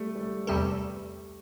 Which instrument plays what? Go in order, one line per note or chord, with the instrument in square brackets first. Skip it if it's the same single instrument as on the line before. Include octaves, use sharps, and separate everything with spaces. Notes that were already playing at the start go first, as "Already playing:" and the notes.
Already playing: [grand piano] G3 A3
G3
A3
[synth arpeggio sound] E2 C3 G3 C4 A4